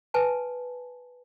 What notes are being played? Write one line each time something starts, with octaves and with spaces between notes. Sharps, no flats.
B4 G#5 A5